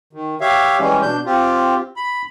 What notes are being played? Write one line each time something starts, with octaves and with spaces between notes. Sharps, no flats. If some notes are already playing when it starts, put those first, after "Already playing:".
D#3
G4 C#5 E5 F5
E3 G3 G#3 C#4
B2 D4 G6
C4 F4 G4
B5